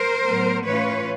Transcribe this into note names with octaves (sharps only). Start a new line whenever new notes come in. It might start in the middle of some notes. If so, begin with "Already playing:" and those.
Already playing: A#4 C5
A2 F#3 B3
A2 E3 A3 C#4 F4 B4 C#5